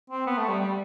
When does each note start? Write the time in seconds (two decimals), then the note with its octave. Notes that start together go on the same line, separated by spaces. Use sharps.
0.10 C4
0.27 B3
0.38 A3
0.49 G3
0.60 G3